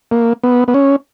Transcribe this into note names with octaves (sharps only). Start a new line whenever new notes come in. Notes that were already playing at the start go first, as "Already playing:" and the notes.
A#3
B3
B3
C#4